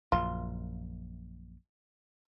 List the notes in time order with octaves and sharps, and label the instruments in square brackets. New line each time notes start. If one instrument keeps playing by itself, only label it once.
[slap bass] A#1 F#2 [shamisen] F4